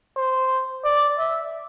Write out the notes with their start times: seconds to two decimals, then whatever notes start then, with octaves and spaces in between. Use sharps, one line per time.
0.16 C5
0.84 D5
1.19 E5